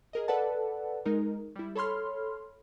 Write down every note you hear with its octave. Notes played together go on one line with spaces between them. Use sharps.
G#4 A#4 D#5
A4 B4 D5 F#5 A5
G#3 D#4 A#4
G3 E4
A4 C#5 B5 C6 F6